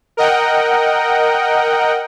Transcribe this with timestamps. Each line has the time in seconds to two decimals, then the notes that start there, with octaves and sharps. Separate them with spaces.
0.17 A#4 D#5 F#5 G5